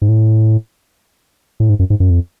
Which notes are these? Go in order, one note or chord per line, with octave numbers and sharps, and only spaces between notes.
G#2
A2
A2
G#2
F#2
G#2
F#2
F2